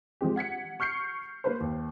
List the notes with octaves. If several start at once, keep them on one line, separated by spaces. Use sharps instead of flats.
F3 G#3 C4 G4
F#5 G#6 B6 C#7
C#6 F6 G6 C7 C#7
A#3 B4 C5
D#2